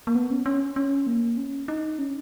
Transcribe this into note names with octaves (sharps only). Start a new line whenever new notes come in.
A#3
B3
C#4
C#4
C#4
A#3
C#4
D#4
C#4